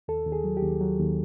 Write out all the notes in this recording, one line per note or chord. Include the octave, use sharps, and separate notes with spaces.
D#2 A4
D#2
G#4
F#3
G4
D#2
F#3
D#2